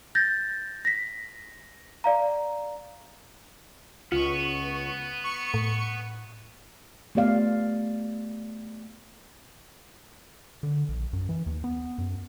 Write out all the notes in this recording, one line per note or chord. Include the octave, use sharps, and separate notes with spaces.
G6 A6 A#6
A#6 B6
D5 F5 A#5
C#2 B3 F4 C#6
C#6 C#7
A2
A3 B3 G4 D5 F5
D3
A#1
F#2
E3
D#2
B3
F#2